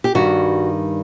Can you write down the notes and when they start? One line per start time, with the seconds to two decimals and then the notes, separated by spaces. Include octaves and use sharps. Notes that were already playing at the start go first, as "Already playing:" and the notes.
0.04 G4
0.15 G2 D#3 G3 F#4